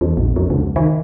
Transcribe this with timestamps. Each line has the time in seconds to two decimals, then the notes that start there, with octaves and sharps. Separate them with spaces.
0.01 E2
0.17 A#1
0.36 F2
0.50 C#2
0.76 D#3